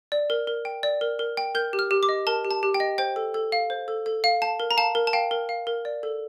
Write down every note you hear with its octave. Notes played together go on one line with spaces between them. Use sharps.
D5
A#4
A#4
G5
D5
A#4
A#4
G5
A#4 G6
G4
F6
G4
D6
D#5
A#4 A5
G4
A5
G4
G5
D#5
C5 G5
A4
A4
F5
C5
A4
A4
F5
F5 A5
A#4
A#5
F5 A5
A#4
A5
F5 G5
A#4
F5
A#4
D5
A4